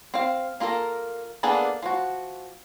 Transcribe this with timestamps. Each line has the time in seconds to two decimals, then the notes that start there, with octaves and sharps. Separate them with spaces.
0.14 C4 F5
0.60 A#3 F4 A4 A#4
1.43 A#3 B3 D4 G#4 A4
1.83 F3 F#4